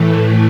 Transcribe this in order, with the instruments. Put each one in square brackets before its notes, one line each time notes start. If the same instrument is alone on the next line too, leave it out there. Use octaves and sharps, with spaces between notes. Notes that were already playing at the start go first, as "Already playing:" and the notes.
Already playing: [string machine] A2 E3 A3